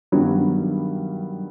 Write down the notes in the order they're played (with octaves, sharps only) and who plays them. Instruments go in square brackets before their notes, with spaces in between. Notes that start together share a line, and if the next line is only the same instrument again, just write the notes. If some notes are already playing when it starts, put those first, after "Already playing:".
[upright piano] G2 D#3 G3 B3 [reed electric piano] F#3